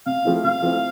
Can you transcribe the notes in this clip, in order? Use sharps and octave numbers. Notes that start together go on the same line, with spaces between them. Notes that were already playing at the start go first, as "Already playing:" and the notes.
C3 F5
F3 A3 C4 E4
C3 F5
F3 A3 C4 E4